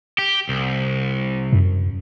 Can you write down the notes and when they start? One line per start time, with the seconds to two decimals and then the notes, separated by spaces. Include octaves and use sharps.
0.18 G4
0.49 C2
1.53 F#2